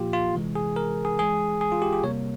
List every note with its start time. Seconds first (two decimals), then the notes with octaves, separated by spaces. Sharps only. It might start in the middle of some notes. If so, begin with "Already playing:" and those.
Already playing: A#2 F3 A#3 F4 G4
0.13 F4
0.34 C3 E3 G#3
0.55 G#4
0.76 A#4
1.05 G#4
1.19 E3 G#3 G#4
1.61 G#4
1.72 F4
1.82 G4
1.93 G4
2.03 C3 G3 A#3 C#5